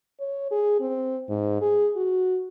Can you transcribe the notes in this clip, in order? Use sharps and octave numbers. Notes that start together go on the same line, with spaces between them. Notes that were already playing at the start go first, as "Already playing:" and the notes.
C#5
G#4
C4
G#2
G#4
F#4